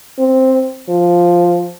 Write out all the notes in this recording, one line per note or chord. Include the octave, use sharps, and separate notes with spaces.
C4
F3